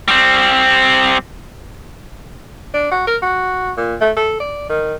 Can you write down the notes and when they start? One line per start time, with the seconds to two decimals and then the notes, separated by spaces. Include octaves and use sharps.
0.08 G3 C4
2.74 D4
2.91 F#4
3.07 A#4
3.22 F#4
3.77 A#2
4.01 A3
4.17 A4
4.40 D5
4.69 D#3